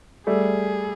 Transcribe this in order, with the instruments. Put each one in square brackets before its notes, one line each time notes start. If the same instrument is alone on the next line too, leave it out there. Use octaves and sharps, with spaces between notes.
[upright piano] G3 A3 [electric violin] G#4